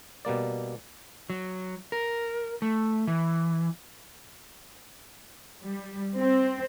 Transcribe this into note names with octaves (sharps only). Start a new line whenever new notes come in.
B2 G3 A#3 D5
F#3
A#4
A3
E3
G3
C4